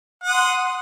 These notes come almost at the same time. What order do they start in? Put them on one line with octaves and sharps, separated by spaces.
F#5 D#6 C6